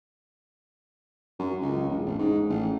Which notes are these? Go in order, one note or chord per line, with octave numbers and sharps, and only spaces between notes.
F#2
C#2
E1
A1
G#2
A1